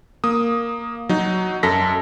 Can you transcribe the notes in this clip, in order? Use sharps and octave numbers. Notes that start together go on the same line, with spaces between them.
A#3 D#6
F#3 D#4
F#2 A4 A#6 B6